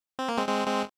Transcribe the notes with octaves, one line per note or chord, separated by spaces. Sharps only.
C4
A#3
G#3 C4
G#3 C4
G#3 C4